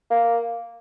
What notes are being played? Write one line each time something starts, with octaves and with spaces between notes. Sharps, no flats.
A#3